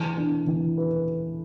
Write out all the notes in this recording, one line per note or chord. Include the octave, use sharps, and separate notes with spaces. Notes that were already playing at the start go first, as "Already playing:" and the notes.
Already playing: E3
D4
E3
B4